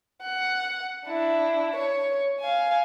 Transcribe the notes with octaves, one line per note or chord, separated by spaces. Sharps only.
F#5
D4 E4
C#5
F5 G#5